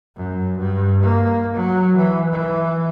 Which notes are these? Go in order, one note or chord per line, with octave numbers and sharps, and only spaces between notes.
F#2
G2
A#3
F#3
E3
E3